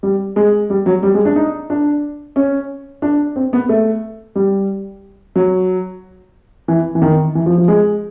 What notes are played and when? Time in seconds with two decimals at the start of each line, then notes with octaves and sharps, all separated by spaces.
0.03 G3
0.36 G#3
0.70 G3
0.86 F#3
1.03 G3
1.14 G#3
1.25 D4
1.36 D#4
1.70 D4
2.36 C#4
3.02 D4
3.36 C4
3.53 B3
3.69 A3
4.35 G3
5.36 F#3
6.68 E3
6.95 E3
7.02 D#3
7.35 E3
7.46 F3
7.58 F3
7.68 G#3